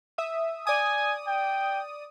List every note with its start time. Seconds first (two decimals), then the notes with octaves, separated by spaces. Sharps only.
0.18 E5 D#6
0.67 D5 G#5 D#6
1.27 G5